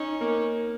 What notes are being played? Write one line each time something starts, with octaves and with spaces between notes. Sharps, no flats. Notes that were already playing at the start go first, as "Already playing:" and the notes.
Already playing: C#4 D#4
A#3